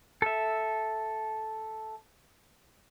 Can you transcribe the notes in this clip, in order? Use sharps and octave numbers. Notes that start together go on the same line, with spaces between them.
A4 E5